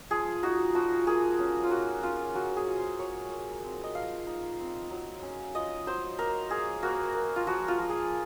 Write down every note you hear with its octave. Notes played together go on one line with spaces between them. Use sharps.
F3 G#4
D#4 F#4
F3 F#4
A#3 G#4
C#4
F4
A#3 F#4
C#4 F4
F#3 F#4
G#4
F4
C5
F#3 C#5
A#3
C4
D#5
F3 F5
D#4
C4
F#3
C#4
F4 D#5
F#3 C5
A#3 A#4
A#3 G#4
A#3 F#4
A#3
F4
F3 F#4
F4
F3
G#4